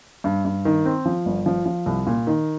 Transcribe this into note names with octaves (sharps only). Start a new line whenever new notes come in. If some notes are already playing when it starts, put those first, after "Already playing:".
G2
G2
D#3
C4
F3
G1
F3
F3
C2
A#2
D#3